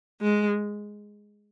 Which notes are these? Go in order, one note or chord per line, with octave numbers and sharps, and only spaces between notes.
G#3